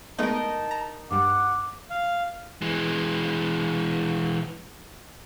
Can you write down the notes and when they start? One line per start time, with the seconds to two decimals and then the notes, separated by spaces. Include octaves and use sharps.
0.19 G#3 A3 B3 D#4 A#4 A5
0.71 A#5
1.11 G2 G3 F#5 D6
1.90 F5
2.62 E3 G#3